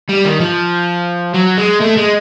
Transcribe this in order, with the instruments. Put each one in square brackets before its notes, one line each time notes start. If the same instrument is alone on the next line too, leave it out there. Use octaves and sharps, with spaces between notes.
[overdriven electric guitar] G3
D#3
F3
F#3
G#3
A3
G#3